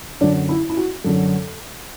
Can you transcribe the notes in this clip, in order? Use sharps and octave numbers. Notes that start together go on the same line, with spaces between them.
F#2 D3 F#3 D4
E4
E4
F#4
F#2 D3 F#3 A4